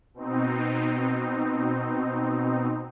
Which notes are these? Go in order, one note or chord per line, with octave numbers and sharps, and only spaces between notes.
B2 C4 D#4